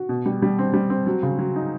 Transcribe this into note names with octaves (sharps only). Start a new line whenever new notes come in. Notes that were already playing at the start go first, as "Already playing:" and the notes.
Already playing: F#4
B2
G3
G3
C4
G3
C4
F#3
C#3
F#3
D#4